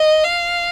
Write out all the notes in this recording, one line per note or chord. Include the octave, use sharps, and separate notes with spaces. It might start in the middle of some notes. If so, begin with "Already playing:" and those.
Already playing: D#5
F5